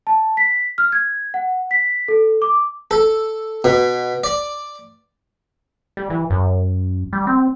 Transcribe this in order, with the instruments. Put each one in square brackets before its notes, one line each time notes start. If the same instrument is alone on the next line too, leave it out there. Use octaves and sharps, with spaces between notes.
[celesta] A5
B6
F6
G#6
F#5
B6
A4
D6
[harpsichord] A4
B2
D5
[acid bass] G3
E3
F#2
G3
C4